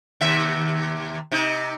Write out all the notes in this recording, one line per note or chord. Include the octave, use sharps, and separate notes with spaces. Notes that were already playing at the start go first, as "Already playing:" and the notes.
D#2 C3 E5
C3 D#4